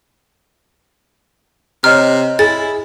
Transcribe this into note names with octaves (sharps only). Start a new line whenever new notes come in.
C3 C#5 D#5 A#5 F6
E4 G#4 A6